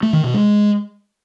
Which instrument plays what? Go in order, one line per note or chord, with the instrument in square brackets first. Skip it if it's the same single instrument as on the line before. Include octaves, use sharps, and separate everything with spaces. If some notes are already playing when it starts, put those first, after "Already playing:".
[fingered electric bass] A3
D#3
B2
G#3